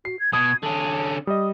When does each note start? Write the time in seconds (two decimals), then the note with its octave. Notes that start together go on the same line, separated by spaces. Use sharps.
0.05 F#4 C7
0.20 G#6
0.33 B2 D#6 G#6
0.63 D3 C#4 A5
1.27 G3 D#5 D#6